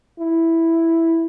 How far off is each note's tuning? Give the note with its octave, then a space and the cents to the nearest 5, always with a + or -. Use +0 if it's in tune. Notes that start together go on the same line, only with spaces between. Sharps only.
E4 +0